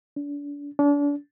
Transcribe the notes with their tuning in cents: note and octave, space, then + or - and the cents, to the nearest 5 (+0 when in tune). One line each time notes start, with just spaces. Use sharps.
D4 -35
D4 -35